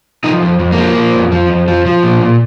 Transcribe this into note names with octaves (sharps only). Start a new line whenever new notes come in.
F3 D#4
F2
F2
A#3
F3
F3
F2
F3
F2
F3
F3
A#2
A#2